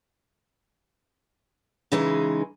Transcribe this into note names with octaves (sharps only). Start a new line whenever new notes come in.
C#3 E3 G#3 D#4